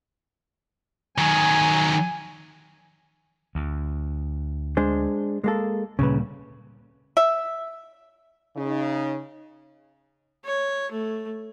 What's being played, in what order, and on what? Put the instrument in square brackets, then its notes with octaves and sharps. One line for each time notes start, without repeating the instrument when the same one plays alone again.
[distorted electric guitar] D#3 F#3 [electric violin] G#5
[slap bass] D2
[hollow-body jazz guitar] G#3 D4 C5
G#3 A#3 A4
[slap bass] D2 A#2 G3 [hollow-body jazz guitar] C#3 B4
[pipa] E5
[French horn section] C#3 D#4
[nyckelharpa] C#5
A3